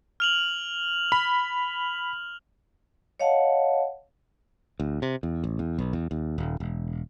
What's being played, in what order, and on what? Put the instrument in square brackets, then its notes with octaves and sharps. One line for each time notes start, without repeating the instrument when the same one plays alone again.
[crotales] F6 F7 F#7
[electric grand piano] B5
[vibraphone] C#5 D#5 F5 F#5 A5
[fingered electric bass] D2
C3
E2
A1
E2
B1
E2
D#2
D#1
E1